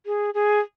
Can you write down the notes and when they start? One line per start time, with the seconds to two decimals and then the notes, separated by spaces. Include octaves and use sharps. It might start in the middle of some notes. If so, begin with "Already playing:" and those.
0.06 G#4
0.34 G#4